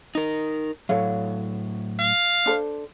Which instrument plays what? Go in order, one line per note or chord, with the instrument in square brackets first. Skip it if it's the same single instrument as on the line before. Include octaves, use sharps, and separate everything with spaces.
[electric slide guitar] D#4 A#4
[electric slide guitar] A2 F#3 [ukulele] A4 C#5 F5
[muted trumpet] F5
[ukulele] D4 A4 C5